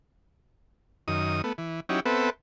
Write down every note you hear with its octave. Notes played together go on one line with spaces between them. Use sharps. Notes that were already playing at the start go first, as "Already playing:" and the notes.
F#2 D#3 D#6
A3 B3
E3
F#3 C#4 D#4 E4 G4
B3 C4 A4 B4 E5 F#5